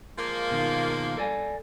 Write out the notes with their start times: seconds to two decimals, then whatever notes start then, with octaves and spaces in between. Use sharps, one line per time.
0.18 F3 G#3 A#3
0.51 B2 D#3 F4
1.17 A4 D5 G#5